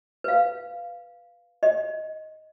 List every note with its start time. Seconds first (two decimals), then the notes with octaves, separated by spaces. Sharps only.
0.24 B4 F5
1.63 D#5